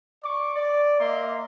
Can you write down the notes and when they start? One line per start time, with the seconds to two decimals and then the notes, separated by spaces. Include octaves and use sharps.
0.24 D5 C#6 D6
0.55 D5
0.99 A#3 D#5 E5 C6